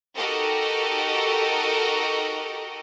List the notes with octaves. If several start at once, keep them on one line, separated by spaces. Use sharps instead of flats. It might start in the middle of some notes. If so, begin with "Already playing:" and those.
D#4 F#4 G4 A4 A#4 D#5